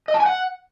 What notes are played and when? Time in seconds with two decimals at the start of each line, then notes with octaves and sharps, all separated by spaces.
0.08 D#5
0.14 A5
0.20 G#5
0.26 F#5